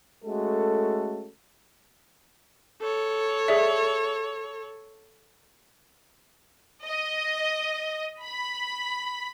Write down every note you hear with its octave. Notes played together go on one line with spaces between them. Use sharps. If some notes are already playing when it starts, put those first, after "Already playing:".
G#3 A3 C#4 F#4 A4
A4 C#5
G#4 D5 E5
D#5
B5